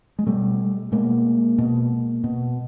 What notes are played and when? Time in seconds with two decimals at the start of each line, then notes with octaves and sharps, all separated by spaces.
0.19 G#3
0.27 B2 G3 A3
0.92 B2 G#3 A#3
1.58 B2
2.24 B2